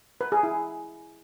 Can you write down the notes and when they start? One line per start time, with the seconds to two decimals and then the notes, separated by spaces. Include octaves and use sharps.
0.21 B4
0.32 G#4
0.43 E4